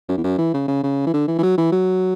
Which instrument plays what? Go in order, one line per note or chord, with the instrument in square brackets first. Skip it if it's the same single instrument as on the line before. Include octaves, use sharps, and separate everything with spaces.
[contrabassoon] F#2
E2
F#2
E3
C#3
C#3
C#3
E3
D3
E3
E3
F#3
E3
F#3